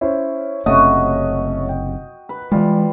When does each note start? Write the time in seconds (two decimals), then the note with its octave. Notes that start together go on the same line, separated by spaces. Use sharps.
0.01 C#4 E4 C5
0.66 F#1 C3 A3 C#4 F#4 D#5
1.69 G5
2.29 B4
2.52 E3 G3 G#3 F4